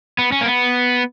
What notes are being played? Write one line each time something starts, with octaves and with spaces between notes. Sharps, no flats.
B3
C#4
A#3
B3